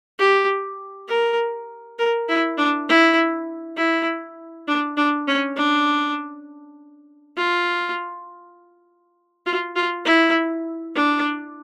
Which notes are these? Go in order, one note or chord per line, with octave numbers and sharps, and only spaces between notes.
G4
A#4
A#4
E4
D4
E4
E4
D4
D4
C#4
D4
F4
F4
F4
E4
D4